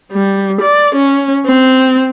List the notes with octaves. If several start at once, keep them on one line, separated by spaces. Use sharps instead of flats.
G3
D5
C#4
C4